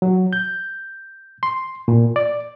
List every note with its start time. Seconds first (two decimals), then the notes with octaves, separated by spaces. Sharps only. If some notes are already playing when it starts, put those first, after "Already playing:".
0.02 F#3
0.33 G6
1.43 C6
1.88 A#2
2.16 D5